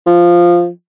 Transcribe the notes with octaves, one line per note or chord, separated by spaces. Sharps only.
F3